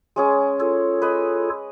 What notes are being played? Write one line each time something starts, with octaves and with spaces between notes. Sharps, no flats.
G#3 C#4 G#4
F4 A4 C#5
B4 D#5